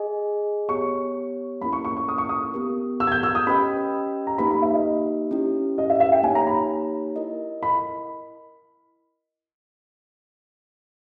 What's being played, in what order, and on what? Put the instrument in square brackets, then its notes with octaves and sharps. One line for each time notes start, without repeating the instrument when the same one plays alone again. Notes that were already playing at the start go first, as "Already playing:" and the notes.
Already playing: [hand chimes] G#4 D#5 G#5
[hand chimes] B3 G4 C#5 [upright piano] C#6
[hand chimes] A#3 C#4 E4 A#4 [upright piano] B5
[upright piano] C#6
C#6
C#6
D#6
C#6
D#6
[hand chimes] B3 G4 A#4
[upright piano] E6
G#6
G6
E6
D#6
[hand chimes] C#4 G4 B4 D#5 G5 [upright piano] B5
[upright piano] A#5
[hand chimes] A#3 D#4 G4 B4 [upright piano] B5
[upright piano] B5
E5
D#5
[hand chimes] C#4 E4 G4
[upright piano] D#5
E5
E5
G5
[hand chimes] A#3 D#4 G4 C#5 [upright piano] G#5
[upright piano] A#5
B5
[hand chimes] E4 A#4 D#5
[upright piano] B5